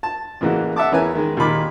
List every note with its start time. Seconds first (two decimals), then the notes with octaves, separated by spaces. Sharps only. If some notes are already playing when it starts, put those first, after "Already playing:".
0.03 A5
0.41 A1 C#3 E3 A#3 F#4
0.76 E5 F#5 A5 D6
0.92 E2 C#4 E4 A#4 B4 G#5
1.15 D#3 G#3
1.37 D#2 A#2 D#3 B5 D6